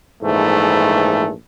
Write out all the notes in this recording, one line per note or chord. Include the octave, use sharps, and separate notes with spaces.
A#1 G#2 E3 A3